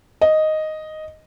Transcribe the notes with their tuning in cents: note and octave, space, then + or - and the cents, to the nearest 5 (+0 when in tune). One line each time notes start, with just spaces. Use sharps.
D#5 +0